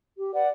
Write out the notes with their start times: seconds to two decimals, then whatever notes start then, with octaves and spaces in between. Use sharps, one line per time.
0.18 G4
0.33 B4 D5 F#5